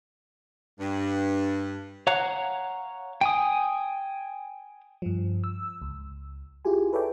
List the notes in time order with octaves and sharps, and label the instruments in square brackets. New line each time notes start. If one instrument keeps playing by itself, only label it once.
[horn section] G2
[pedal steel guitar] C#5 F5 F#5 A#5 F#6
G5 G#5 D#6
[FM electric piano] G2 F3
E6
C#2
E4 F4 G4 G#4 G#5
A4 B4 C#5 D5 E5 G5